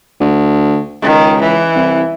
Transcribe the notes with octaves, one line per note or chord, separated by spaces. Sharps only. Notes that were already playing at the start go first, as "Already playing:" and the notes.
D2
C#2 D#3
E3
C2